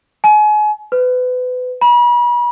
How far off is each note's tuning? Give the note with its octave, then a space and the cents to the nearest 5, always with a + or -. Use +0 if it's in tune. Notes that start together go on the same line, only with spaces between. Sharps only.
G#5 +35
B4 +30
B5 -40